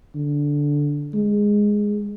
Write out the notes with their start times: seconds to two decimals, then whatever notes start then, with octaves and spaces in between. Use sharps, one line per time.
0.15 D3
1.14 G#3